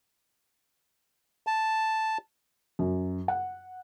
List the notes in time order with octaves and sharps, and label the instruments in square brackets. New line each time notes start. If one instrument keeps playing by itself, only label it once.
[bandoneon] A5
[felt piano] F#2
F#5